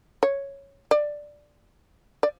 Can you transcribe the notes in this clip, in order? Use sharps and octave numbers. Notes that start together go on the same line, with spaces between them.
C#5
D5
D5